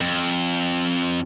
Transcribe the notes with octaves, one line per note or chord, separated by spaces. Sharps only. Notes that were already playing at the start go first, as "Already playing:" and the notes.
F2